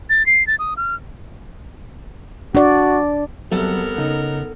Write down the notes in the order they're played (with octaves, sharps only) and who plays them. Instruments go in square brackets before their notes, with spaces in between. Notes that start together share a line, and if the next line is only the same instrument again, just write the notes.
[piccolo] A6
C7
A6
D#6
F6
[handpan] D4 D5 [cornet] F#4
[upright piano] F2 G3 [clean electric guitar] F#3 [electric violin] B3 A#4 [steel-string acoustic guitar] A4 F#5
[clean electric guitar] C#3 [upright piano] D#4